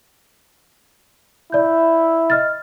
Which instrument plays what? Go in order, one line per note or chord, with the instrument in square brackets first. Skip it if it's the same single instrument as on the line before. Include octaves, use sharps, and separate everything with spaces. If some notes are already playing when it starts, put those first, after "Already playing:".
[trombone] E4 [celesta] D5 G6
[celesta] D#5 F6 A6